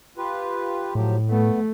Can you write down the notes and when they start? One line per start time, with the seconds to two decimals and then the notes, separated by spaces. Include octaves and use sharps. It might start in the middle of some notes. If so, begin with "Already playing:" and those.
0.18 F4 G4 B4
0.95 A2 F3 F#3 G4
1.30 A3 B3